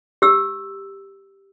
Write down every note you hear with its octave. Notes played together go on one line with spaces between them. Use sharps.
G4 E6